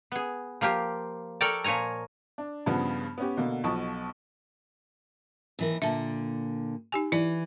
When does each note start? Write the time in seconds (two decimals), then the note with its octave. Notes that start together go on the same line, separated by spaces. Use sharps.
0.12 B3 G#4
0.61 F3 A#3 F4 G4
1.41 A4 A#4 C#5 D5 G5 A5
1.64 A#2 F3 C#5 G#5 A#5
2.38 D4
2.66 G2 C#3 F3 B3
3.18 B3 C#4 G4
3.37 B2 D3 A#3
3.64 B1 B2 F3 A5 C#6 D#6
5.59 D#2 E3 A#4
5.82 A#2 D3 E5 A5
6.92 D#4 G4 G#5
7.12 E3 E4 D5